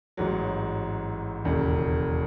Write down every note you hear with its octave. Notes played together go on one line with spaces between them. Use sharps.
A1 G#2 F#3
E1 D#2 C#3